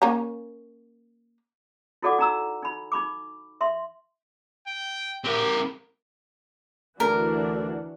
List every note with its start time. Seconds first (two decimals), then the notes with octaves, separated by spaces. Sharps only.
0.02 A#3 C#4 A#5
2.02 E4 F#4 A4 D5 F#5 D6
2.19 D#4 A#5 E6
2.62 D#4 B5
2.92 D#4 B5 D6
3.61 E5 C6
4.67 G5
5.24 C4 G4 A#4
7.00 D2 E3 D4 F#4 A#4